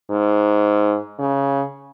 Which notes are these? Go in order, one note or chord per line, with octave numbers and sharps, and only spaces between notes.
G#2
C#3